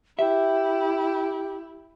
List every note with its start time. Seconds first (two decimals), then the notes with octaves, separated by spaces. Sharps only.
0.19 E4 G4 E5